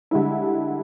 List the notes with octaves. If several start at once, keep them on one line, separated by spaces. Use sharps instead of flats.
D3 G3 G#3 E4